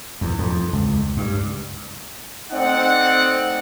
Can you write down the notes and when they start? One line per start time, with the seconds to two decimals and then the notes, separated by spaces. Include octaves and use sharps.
0.21 E2
0.38 F2
0.73 C#2
1.17 G2
2.51 A3 C4 D#4 D5 F#5